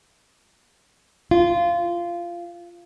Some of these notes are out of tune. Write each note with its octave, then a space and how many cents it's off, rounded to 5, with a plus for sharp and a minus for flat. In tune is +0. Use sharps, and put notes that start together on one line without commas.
F4 -15